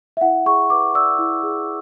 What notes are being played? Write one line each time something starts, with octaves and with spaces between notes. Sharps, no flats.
E5
E4 F#5
G#4 C#6
B4 D6
D5 E6
E4
G#4